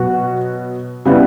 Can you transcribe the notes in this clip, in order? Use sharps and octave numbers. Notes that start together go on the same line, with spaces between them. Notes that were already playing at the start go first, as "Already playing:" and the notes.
Already playing: B2 F#3 B3 F#4 F#5
C#3 G3 B3 E4